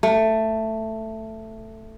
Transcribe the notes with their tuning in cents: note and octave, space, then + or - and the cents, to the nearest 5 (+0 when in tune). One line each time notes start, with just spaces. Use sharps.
A3 +10